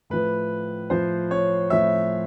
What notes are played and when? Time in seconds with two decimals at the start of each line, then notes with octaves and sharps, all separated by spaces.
0.10 A2 F3 B4
0.90 A2 F3 C5
1.31 C#5
1.70 A2 F3 E5